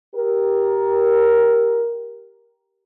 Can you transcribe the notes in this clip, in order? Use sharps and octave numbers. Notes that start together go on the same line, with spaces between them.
G4 A#4